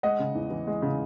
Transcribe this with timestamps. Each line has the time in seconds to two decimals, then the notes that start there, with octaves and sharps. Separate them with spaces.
0.03 G#3 D#5 F#5
0.19 C#3
0.35 E2
0.50 E3
0.67 G#3
0.82 C#3